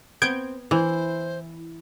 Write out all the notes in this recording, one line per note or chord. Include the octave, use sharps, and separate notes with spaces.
B3 C4 G6 G#6 D7
E3 E4 C5